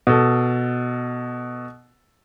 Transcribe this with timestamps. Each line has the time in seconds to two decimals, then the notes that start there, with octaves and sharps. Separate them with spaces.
0.07 B2 A4